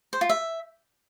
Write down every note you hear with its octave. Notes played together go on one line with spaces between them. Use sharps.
C5
F4
E5